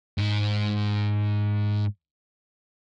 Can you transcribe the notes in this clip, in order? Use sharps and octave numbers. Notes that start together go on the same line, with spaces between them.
G#2 D#4